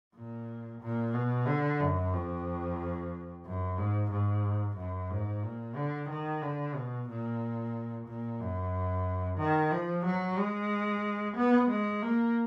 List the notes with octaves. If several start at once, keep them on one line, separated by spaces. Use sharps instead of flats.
A#2
A#2
B2
D3
F#2
F2
F#2
G#2
G#2
F#2
G#2
A#2
D3
D#3
D3
B2
A#2
A#2
F#2
D#3
F3
F#3
G#3
B3
G#3
A#3